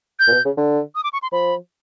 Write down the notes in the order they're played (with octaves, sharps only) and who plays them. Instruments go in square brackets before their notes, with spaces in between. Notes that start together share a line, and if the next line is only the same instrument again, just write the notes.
[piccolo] G6
[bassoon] A#2
B2
C#3
D3
[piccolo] D#6
D6
C#6
C6
[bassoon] F3 [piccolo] B5